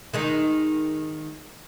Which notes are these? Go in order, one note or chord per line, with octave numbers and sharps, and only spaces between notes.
D#3 G#3 D#4